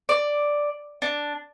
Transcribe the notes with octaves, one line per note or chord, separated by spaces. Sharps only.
D5
D4